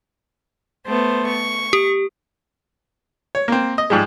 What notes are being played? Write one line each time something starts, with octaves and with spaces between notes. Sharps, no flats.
A3 B3 C5
C#6
G4
C#5
A#3 C4
D#5
G#2 F3 G3 G#3